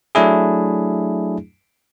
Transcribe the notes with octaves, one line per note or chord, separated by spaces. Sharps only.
F#3 A3 D4 E4 G#4